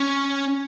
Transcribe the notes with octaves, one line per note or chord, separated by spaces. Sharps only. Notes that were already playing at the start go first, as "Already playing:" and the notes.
Already playing: C#4